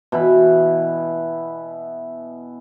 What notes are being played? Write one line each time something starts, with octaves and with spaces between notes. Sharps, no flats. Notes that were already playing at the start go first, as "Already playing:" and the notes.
B2 E3 E4 B5